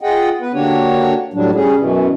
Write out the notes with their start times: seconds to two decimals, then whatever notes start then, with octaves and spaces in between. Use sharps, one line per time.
0.01 F4 G#4 D#5 F#5 G5
0.41 B3 B4
0.54 D3 A#3 D4 F#4 G4 C#5
1.34 A2 F#3 G3 D4
1.55 G3 C#4 G#4
1.77 F#2 B2 E3